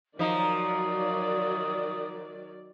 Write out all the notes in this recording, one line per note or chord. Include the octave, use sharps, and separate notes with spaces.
D#3 F3 F#3 D#4 D5 D#6